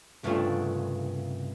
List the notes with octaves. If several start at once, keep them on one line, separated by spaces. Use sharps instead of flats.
C2 G2 C#3 A3 D4 F4